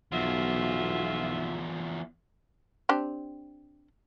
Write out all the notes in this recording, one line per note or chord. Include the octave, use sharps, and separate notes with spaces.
B1 E2 F3 F4 F#4 E5
C4 D4 G4